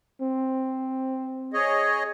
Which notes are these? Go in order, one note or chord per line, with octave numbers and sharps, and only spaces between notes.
C4
G#4 C#5 D#5